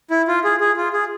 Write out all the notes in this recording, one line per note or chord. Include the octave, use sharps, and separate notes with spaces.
E4
F4
G#4
G#4
F4
G#4